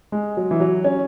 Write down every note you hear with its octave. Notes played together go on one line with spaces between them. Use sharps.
G#3
F#3
E3
F#3
C#4